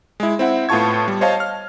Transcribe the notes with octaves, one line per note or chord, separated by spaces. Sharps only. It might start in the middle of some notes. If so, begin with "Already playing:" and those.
G#3 E4
C4 E4 F#5
A2 B3 F4 A5 C#6 G#6
G3
C5 C#5 D#5 F5 A5
F6